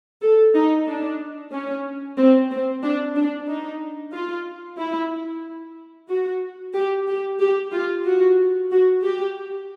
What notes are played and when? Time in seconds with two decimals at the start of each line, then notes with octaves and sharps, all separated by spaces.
0.22 A4
0.55 D#4
0.88 D4
1.52 C#4
2.18 C4
2.51 C4
2.83 D4
3.16 D4
3.49 D#4
4.13 F4
4.78 E4
6.10 F#4
6.74 G4
7.08 G4
7.41 G4
7.73 F4
8.05 F#4
8.71 F#4
9.03 G4